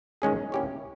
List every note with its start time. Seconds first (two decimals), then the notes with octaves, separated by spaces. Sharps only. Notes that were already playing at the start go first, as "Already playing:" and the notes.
0.22 D#3 G#3 C#4 G#4
0.52 A#3 C#4 E4 G4 C#5